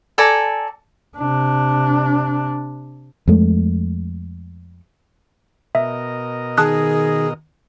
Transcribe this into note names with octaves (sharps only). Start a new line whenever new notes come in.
A4 D5 G#5 A#5
C3 D4
F2 G#3 A3
B2 A#4 D#5 E5
D#3 G#4 A5 D#6 F#6